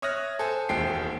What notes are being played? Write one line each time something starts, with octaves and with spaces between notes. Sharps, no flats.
C#5 E5 D#6 F6 F#6 A#6
A4 C5 G#5
E1 D#2 C5 G5 C7